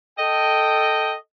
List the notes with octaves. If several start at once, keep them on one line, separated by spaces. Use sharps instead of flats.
A4 D#5 G5